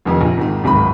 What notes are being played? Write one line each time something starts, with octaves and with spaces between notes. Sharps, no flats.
F1 F2 D#3
A#1
G#1 G#2 D#3
D1 G#1 D#3 B5